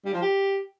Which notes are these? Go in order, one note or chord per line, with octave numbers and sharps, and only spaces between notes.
G3
F3
G4